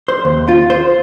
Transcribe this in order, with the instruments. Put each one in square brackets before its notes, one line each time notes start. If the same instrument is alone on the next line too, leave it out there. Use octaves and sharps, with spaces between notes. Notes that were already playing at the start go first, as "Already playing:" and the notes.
[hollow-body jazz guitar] C5
D#2
F4
C5